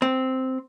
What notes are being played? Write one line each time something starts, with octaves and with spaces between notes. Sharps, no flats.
C4